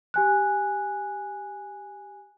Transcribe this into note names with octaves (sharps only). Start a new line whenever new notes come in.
G4 G#5 F#6